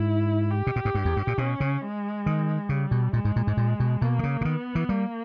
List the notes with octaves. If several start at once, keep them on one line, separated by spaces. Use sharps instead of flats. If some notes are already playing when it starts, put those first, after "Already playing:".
Already playing: G#2 E4
G4
B2
A#2
G#2
G2
E2
G2
A#2
B2 C#4
C#3
G#3
D#3
C#3 G3
B2
A#2 G#3
G#2
A#2
G#2
A#2
B2
B2 A#3
D#3
C#3
C#3
D#3 B3
E3
G3 A#3